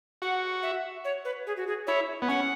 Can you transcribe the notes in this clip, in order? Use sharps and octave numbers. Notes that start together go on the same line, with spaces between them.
F#4 F#5
E5
C#5
B4
G#4
F#4
G#4
E4 C#5
B3
C#4 F#5